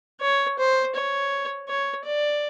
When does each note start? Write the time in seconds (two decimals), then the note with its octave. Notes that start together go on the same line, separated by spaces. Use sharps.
0.21 C#5
0.58 C5
0.95 C#5
1.68 C#5
2.05 D5